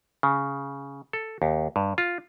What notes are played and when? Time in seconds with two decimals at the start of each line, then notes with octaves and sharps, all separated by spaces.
0.23 C#3
1.13 A4
1.42 D#2
1.76 G2
1.98 F4